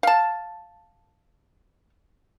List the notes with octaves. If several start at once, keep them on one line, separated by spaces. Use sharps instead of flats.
F5 A5